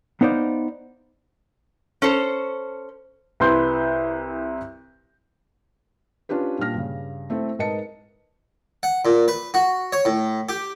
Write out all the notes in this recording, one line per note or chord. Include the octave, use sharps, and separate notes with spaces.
B3 D#4 C5 D5 F5
C#4 A4 C5
C2 E4 B4 C6 G6
C#4 D4 F4 G4 B4
A#2 G3 D4 F6 A#6
G2 C#3
A3 C4 E4 A4
G#2 A#4 B4 D#5 A5 C#7
F#5
A#2
B4
F#4
C#5
A2
G4